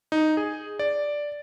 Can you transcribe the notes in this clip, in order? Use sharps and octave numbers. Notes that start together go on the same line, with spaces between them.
D#4
G#4
D5